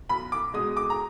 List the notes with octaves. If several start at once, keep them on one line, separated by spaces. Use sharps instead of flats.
B1 B5
D6
B2 G#3 D#6
D6
A#5